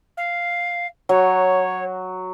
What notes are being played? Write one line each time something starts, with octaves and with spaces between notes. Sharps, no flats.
F5
F#3 C#5